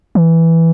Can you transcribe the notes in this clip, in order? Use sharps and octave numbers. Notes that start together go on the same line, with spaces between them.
E3